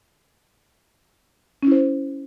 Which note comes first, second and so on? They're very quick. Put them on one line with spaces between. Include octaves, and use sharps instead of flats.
C#4 E4 C5